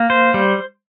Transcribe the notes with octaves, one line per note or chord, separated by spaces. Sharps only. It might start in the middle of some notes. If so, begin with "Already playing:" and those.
Already playing: A#3
C5
G3